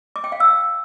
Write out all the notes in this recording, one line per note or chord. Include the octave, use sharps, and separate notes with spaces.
D6
G5
F5
E6